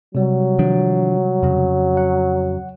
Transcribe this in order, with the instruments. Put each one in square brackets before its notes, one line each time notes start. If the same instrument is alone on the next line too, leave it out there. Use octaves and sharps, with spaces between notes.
[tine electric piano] C3 G3 [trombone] F#3
[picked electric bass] D#3 F3 D4
F2 C#3
[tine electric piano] F#5